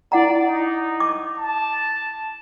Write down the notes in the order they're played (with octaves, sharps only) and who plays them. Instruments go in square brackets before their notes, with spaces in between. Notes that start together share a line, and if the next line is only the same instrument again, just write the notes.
[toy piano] E4 F#5 A#5 [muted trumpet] D5
[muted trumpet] D#4
[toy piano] D6
[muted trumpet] A5